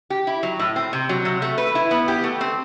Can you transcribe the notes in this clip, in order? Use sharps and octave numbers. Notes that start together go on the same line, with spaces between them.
G4
E4
F#3
A2
C4
C3
F#3
C3
A3
B4
E4
B3
G4
A3
C4